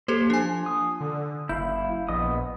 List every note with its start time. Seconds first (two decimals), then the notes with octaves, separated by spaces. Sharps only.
0.08 A#3 G4 A4 C5
0.30 F3 D4 G#5
0.66 D#6
1.01 D3
1.49 F#1 E4 F5 G6
2.09 A#1 B3 D#5 D#6